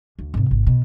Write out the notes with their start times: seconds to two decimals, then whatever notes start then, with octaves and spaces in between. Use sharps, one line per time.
0.19 D2
0.34 G#1 C3
0.51 G#1
0.66 B2